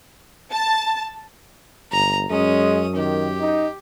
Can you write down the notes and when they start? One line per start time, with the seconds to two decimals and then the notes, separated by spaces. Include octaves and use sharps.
0.52 A5
1.92 G1 A#5
2.30 F#2 G#3 C#4 D#6
2.96 D#3 G4
3.40 D#4